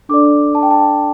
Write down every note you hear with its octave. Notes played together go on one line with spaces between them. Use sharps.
D4 A4 D5 D6
A5
G5
A5